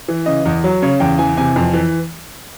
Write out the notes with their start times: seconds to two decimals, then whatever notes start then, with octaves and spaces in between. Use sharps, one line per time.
0.08 E3
0.26 C#3 D#5
0.46 E2
0.64 F#3
0.82 C#3 C#5
1.00 E2 G5
1.19 E3 G#5
1.37 C3 G#5
1.56 F2
1.74 E3